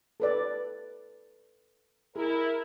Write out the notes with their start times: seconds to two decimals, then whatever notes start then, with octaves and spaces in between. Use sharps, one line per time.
0.20 A4 B4 D5
2.16 E4 G#4 A#4